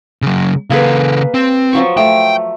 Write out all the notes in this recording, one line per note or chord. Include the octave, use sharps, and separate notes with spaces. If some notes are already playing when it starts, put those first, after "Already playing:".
C#3 F#3
C#3 A#3 G#4 A4 B4
C4
F3 F#3 C#6
A3 G5